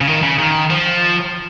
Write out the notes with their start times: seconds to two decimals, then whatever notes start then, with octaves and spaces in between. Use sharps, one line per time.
0.01 C#3
0.07 D#3
0.22 C#3
0.39 D#3
0.70 F3